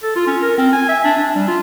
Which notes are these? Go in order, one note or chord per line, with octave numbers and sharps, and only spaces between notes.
A4
F4
C#4
A#4
C4
G#5
E5
D4
D4
G3
F4